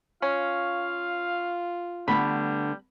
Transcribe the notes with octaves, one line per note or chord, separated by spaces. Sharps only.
C#4 F4 F5
D3 G3 A3 B3 B5